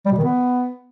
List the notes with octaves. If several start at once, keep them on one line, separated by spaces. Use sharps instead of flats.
G3
B2
D#3
B3